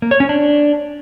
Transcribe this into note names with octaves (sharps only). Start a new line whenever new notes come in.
A#3
C#5
C#4
D4